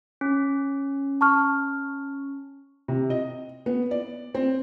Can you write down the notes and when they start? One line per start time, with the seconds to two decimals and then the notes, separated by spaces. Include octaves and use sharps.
0.21 C#4
1.21 A5 C#6 F6
2.88 C3
3.10 D#5
3.66 B3
3.91 D5
4.35 C4